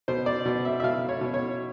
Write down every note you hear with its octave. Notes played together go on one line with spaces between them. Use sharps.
B2 C5
D5
B2
E5
E5
B2 F5
C#5
B2
C#5